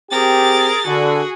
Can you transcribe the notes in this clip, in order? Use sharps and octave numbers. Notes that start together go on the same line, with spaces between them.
C4 G4 G#4 A#4 A6
D3 F#4 G#4